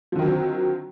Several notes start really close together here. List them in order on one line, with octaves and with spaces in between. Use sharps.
F3 D3 D#3 F#3 C4